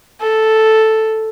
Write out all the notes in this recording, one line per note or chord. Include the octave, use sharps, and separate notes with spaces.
A4